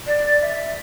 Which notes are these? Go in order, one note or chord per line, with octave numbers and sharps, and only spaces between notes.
D5
E5